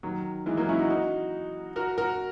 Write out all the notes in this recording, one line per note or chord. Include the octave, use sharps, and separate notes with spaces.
D#3 F#3
E3 G#3
F#3 A#3
C#4 E4
D#4 F#4
D#4 F#4
F#4 A#4
F#4 A#4